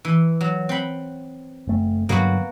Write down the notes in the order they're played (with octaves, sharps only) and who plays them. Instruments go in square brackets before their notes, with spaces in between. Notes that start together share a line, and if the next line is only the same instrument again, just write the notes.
[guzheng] E3
F#3
C4 F#5 B5
[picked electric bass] F#1 A3
[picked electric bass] G2 D3 F#3 [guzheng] A#3 B3 F#4